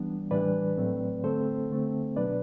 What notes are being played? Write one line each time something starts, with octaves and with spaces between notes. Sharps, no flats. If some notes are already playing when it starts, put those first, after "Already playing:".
Already playing: E3 G3 B3 D4
A2 E3 G3 D4 B4 D5
A2 F#3 A3 C4
D3 A3 C4 A4 C5
D3 A3 C4
B2 F#3 B3 D4 B4 D5